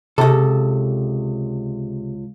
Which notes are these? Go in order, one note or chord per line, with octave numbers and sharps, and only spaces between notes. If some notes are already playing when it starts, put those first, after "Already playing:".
C#2 C3 A4